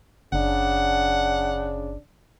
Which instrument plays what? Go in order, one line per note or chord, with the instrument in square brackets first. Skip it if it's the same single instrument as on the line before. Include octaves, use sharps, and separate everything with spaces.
[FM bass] F#1 [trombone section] C#3 D4 [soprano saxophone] F#5